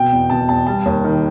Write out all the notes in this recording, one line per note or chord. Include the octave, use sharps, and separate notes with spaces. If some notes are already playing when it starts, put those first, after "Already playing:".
Already playing: B2 G5
E2
B2 A5
E2 A5
G3 A5
D#2
D#3